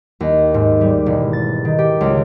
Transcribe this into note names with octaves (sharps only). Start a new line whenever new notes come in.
D#2
G#2
G3
E1
A6
D#3
G4
C#2